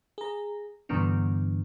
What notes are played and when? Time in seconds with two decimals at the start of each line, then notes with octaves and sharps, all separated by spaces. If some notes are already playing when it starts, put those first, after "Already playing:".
0.18 G#4 A#5
0.89 G2 B2 D3 E3 B3 D4